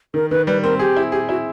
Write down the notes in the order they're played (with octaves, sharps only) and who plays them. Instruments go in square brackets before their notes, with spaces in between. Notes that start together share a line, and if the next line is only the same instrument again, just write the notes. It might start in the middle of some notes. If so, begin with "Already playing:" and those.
[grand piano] D#3 [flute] A#4
[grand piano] D#3 [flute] B4
[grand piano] G3 [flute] B4
[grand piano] C4 [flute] A#4
[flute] G4 [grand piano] G#4
[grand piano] E4
[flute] G4 [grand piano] G#4
[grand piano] E4 [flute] F#4